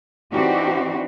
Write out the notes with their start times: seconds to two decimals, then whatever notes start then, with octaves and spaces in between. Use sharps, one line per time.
0.32 E3 C4 D4 D#4 F#4 G4